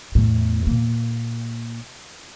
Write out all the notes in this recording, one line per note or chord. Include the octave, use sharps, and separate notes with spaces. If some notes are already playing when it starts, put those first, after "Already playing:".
E2 A2
A#2 A#3